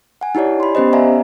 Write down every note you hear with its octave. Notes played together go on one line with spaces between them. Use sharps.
F#5 G#5
D#4 E4 G4 C#5 D5
B5 C6
B3 C#4 G4 C5 D#5
D5 E5 F5 G#5 A#5